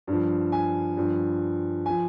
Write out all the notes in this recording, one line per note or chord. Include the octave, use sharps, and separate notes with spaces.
G2 F3
G#5
G2 F3
F3 G#5